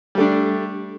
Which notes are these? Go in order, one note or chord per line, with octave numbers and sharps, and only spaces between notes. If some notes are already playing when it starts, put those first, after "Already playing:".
G3 A3 D4